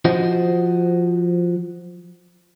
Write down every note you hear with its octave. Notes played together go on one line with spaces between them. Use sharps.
F3 F#4 C5 D#5